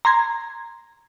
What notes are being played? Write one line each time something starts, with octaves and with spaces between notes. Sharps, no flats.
A#5 C6 G#6